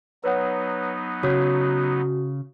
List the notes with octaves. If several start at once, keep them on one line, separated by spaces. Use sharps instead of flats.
F#3 B3 D#4 B4 C#5 F#5
C#3 F#4 C#5